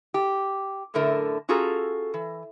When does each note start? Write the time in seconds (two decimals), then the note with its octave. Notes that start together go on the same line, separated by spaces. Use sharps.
0.14 G4
0.94 F#2 A2 D3 A3 A#4 E5
1.49 C#4 F4 F#4 G#4 A4 A#5
2.14 E3